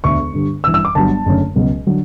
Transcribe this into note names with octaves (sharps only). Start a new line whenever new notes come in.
E1 D2 D3 C#6
G2 D3 G3
A1 G2 E3 E6
E6
D6
G1 G2 F#3 A5
F#1 F#2 D3 A3 C#4
C#2 B2 F#3
D3 F#3